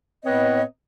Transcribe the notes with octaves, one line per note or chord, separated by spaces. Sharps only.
A2 B3 C4 B4 C#5 D#5